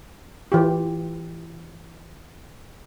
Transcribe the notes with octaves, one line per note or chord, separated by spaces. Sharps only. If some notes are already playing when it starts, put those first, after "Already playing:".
E3 F4 G4